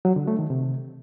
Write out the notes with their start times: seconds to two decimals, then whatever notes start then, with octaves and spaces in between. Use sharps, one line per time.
0.05 F#3
0.16 D3
0.27 A3
0.39 D#3
0.50 C3